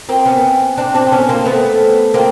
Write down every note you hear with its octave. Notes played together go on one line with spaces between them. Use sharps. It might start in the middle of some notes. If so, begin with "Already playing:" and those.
A#3 C4
B3 C#4
C4 D4
C4 D4
C4
B3 C#4
A#3 C4
A3 B3
A#3 C4